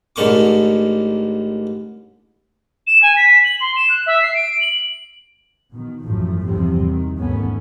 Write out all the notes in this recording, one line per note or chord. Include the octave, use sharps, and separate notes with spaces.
A1 G#2 D3 A#3 C#6 D6
E7
G#5
B6
F#7
C6
E7
F#6
E5
C7
D7
F#7
B2 D#3
A1 F#2 A2 F3 A3
E2 G2 C3 F3 G3 C4
D#3
D#2 G#2 A3 B3 C#4